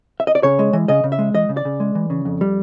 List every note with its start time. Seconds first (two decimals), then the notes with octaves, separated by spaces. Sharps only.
0.20 E5
0.27 D#5
0.35 D5
0.43 C#3 C#5
0.59 G#3
0.73 E3
0.88 C#3 D#5
1.04 C#3
1.12 E5
1.19 G#3
1.34 E3 D#5
1.49 C#3
1.57 D5
1.65 C#3
1.80 G#3
1.95 E3
2.10 C#3
2.25 F2
2.41 G3